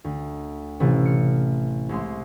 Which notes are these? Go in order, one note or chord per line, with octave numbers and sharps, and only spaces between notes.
D2
A1 C3 A3
F6 C#7
C2 G#3 C6